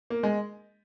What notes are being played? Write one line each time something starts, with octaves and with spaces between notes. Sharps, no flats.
A#3
G#3